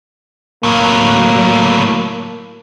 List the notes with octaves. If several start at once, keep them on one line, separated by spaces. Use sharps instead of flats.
A2 F#3 A#3